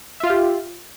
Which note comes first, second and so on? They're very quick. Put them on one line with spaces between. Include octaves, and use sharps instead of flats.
E5 F4 F5 G4